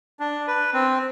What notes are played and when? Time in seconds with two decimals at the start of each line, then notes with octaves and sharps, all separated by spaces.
0.20 D4
0.47 B4
0.74 C4